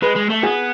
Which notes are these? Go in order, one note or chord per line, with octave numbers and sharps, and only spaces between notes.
G#3 B4
G#3
A3
B3 G#4